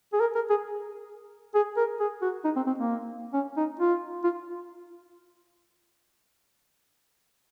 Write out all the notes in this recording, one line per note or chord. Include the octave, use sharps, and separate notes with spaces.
G#4
A#4
A#4
G#4
G#4
A#4
G#4
F#4
D#4
C4
C4
A#3
C#4
D#4
F4
F4